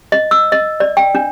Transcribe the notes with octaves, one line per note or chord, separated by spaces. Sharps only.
D#5
E6
D#5
D5
G5
D4